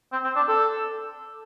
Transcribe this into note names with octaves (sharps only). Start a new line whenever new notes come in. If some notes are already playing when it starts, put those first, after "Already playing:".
C4
C4
D4
A4